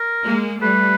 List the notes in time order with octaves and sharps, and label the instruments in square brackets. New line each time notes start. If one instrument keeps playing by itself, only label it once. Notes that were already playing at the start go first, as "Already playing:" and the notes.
Already playing: [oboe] A#4
[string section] G#3 A#3
[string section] G3 A3 [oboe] B4